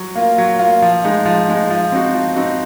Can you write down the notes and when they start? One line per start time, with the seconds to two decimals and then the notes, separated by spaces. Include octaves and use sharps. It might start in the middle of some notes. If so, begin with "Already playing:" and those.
Already playing: F#3
0.15 A#3 F4
0.38 F#3
0.59 A#3 F4
0.82 F3
1.04 G#3 D#4
1.25 F3
1.48 G#3 D#4
1.70 F3
1.92 C4 D#4 F#4
2.15 F3
2.36 C4 D#4 F#4